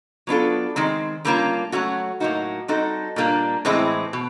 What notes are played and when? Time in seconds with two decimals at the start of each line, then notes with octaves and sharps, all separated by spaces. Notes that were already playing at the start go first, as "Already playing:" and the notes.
0.27 F#3 B3 D4 F4 A4
0.76 D#3 G#3 C4
1.25 D3 G3 A#3 C#4 F4
1.72 F#3 A3 C#4 F#4
2.20 A2 F#3 A#3 D#4 F#4
2.68 G3 C4 D#4 F#4 A4
3.16 A#2 G3 A#3 D4
3.65 A2 E3 G#3 C4 E4
4.13 B2